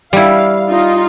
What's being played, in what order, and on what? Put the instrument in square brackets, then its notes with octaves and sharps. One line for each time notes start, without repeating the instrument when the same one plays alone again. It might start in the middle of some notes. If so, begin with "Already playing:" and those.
[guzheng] G3 E4 [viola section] F5
[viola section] D#4 F4